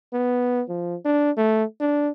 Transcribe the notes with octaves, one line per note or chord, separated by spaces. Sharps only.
B3
F3
D4
A3
D4